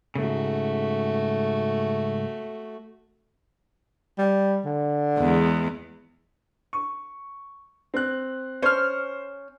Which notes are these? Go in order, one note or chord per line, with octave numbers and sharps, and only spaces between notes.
G#2 C#3 A3 F#4
G3
D3
E2 G#3
C#6
C4 F#6
C#4 C5 F6